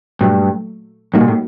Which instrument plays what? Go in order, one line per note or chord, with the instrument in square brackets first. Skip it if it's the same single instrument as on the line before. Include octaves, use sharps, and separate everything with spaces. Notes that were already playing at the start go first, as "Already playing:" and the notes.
[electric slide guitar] G2 [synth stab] A#2 F#3 A3
[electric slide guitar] A2 [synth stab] G3 A#3 D#4 F#4
[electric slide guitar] A#2
A2